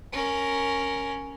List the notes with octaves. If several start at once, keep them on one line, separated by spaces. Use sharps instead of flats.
C#4 A#4